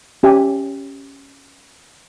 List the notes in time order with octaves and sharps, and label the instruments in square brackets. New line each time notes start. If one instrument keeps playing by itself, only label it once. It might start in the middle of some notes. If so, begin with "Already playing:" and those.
[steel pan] C#4 G4 E5 G#5